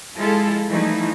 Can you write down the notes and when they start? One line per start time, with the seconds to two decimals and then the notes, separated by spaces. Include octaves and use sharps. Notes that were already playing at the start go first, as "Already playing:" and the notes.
0.15 F3 G#3 E4 F4 A4
0.67 E3 F3 G3 A3 D#4 E4